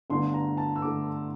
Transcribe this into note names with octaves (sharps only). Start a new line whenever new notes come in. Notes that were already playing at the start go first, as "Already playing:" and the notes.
G1 G2 D3 A3 C6
A#5
A5
E6
D3 A3 D6